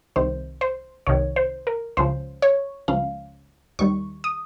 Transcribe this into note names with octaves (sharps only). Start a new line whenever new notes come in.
C2 C3 D#3 C5
C5
C2 C3 D#3 C#5
C5
A#4
C#2 C#3 F3 C5
C#5
C#2 C#3 F3 F5
D#2 D#3 G3 C#6
D#6